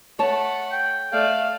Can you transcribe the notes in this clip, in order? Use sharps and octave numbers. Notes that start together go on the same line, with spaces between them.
A3 C#5 F#5 A5
G5
A3 D5 F5